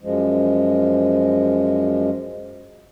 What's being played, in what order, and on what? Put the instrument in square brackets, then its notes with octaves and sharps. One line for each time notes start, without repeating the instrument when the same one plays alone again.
[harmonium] F#2 F3 G#3